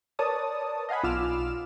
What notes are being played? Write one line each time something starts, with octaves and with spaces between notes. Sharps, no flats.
A#4 B4 C#5 D5 A5 D#6
D#5 F5 F#5 G#5 B5
B1 F4 D6 E6 F6 E7